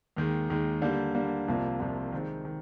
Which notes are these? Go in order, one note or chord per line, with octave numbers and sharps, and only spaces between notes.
D#2 D#3 G#3
D#2 D#3 G#3
D3 G3 A#3
D3 G3 A#3
C2 C3 F3 A#3 F4
C2 C3 F3 A#3 F4
D#3 G#3 C4
D#3